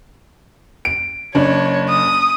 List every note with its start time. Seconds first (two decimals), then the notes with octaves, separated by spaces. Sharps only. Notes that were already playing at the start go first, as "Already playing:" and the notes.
0.85 D7
1.35 F#1 D4 C#5
1.89 D#6